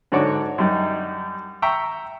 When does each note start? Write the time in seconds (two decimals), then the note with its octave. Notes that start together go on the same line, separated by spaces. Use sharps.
0.12 G#2 D3 F#4 C#5 D5 D6
0.58 F#2 G3 D#4
1.62 E5 G5 A#5 C#6